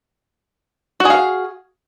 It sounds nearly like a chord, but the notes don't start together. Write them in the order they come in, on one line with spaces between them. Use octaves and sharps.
F#4 G#4 F5